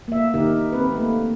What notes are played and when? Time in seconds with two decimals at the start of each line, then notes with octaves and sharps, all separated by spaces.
0.08 A#3 E5
0.34 D#3 D#4 G4 A#4
0.72 C4 B4
0.92 A3 A#3